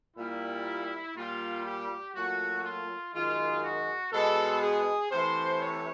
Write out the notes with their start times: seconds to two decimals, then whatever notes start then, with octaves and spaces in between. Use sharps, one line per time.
0.17 A#2 G3 E4
1.16 A#2 G3 F4
1.66 G4
2.14 A#2 F#3 A3 F#4
2.65 F4
3.14 F#2 D#3 G#3 F4
3.63 F#4
4.12 B2 G#3 A4
4.61 G#4
5.11 C3 E3 A3 C5
5.61 C#5